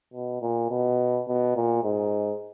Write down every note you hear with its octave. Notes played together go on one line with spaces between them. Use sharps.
B2
A#2
B2
B2
A#2
G#2